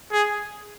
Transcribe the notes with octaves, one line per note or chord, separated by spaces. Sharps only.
G#4